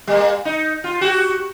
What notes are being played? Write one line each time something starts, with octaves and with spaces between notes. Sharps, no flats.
G3 A#3
D#4
F4
F#4 G4